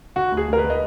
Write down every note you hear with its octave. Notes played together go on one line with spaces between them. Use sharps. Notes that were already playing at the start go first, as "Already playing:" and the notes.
D3 F#4
D2
G#4
D2 A#4
B4
D3
D#5